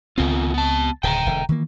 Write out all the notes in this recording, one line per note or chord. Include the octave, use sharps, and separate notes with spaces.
C#2 D#3 B3 C4 F4
B3 A5
D1 C#3 G5 A5 A#5
E1 D3
D#3 E3 A#3